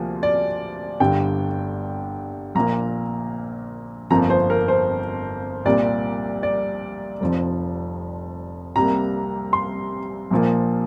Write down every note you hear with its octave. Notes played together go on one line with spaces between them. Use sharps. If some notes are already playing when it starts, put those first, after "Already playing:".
Already playing: D2 C3 F3 A#3
D5
G1 G2 D3 G5
A#1 A#2 A#3 A#5
G1 F2 F3 A#3 A#5
C5
A#4
C5
C2 A#2 G3 A#3 D5
D5
F1 F2 F3
C2 C3 G3 A#3 A#5
C6
A#1 A#2 F3 A#3